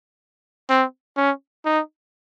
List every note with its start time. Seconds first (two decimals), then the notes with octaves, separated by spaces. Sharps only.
0.70 C4
1.17 C#4
1.65 D#4